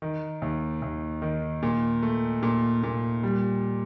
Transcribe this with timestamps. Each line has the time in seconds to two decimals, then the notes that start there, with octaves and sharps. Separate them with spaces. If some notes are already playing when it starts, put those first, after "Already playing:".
0.02 D#3
0.42 D#2
0.82 D#2
1.22 D#3
1.63 A#2
2.03 A3
2.43 A#2
2.83 A#2
3.23 G3